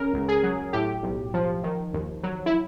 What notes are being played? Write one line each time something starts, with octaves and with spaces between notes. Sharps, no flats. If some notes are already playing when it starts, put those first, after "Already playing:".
Already playing: C#3 A#4
C#2
G#4
F#3
A2 G4
B1
F3
D#3
D#2
F#3
E4